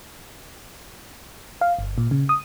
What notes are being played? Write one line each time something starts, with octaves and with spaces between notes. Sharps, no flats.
F5
G1
A#2
C#3
D#6